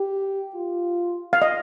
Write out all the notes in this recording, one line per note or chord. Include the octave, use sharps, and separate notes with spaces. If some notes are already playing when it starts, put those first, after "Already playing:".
Already playing: G4
F4
F5
D#5